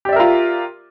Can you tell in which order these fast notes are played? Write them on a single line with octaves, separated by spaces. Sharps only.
G4 D5 E5 A#4 F4